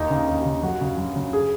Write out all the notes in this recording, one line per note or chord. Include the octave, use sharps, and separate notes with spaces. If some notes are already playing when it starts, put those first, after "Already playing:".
Already playing: D#2 D#4
C#3
D#2
C#3
F#2 F#4
C#3
F#2
C#3
G#4